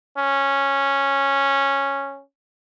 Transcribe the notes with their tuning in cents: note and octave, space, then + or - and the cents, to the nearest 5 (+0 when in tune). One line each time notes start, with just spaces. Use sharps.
C#4 -5